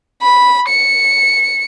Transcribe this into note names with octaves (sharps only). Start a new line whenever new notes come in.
B5
C#7